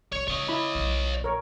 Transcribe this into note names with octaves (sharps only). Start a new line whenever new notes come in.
C2 C#5
C#3 C#5 D#5
E4 B5
B1 F#3
A#1 A#4 C#5